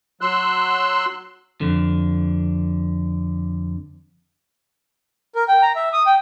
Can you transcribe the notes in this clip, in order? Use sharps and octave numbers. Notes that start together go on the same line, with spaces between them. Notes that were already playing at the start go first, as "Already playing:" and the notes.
F#3 C6 E6 F#6
F2 D3
A#4
G5
A#5
E5
D#6
G5